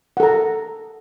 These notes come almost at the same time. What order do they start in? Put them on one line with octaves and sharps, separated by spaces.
F#5 A4 A#5